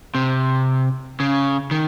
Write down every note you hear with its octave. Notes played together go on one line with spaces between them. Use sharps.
C3
C#3
D#3